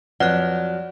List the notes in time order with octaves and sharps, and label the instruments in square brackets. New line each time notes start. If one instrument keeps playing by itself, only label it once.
[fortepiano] F2 [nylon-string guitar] F#3 [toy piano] B4 F#5 [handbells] D5 F#6